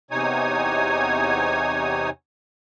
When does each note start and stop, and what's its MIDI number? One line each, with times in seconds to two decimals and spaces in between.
0.11 2.10 40
0.11 2.10 48
0.11 2.10 63
0.11 2.10 73
0.11 2.10 80
0.11 2.10 87